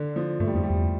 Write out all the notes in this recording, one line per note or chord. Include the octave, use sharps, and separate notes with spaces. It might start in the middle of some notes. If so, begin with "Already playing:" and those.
Already playing: D3
F3
G2 A3
G3
F2 F3
G3
E2